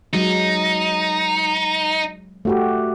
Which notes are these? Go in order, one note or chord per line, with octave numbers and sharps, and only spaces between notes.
F#3 G#3 D#4
A3 F#4 G4